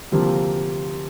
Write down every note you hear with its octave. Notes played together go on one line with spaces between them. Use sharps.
D2 C3 F3 A#3 F4